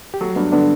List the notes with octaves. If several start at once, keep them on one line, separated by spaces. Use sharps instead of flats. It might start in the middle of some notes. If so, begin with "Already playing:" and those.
G4
F#3 F#4 A4
G2 B3 D4
D3 B3 D4